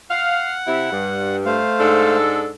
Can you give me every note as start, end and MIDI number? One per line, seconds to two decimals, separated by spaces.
0.10 0.54 77
0.10 1.36 78
0.66 0.88 48
0.66 0.88 64
0.91 1.58 43
1.45 2.16 57
1.45 2.16 72
1.45 2.16 77
1.79 2.50 44
1.79 2.50 62
1.79 2.50 69